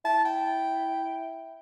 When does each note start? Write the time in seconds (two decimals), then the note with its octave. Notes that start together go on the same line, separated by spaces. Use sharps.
0.05 E4 A5
0.25 G5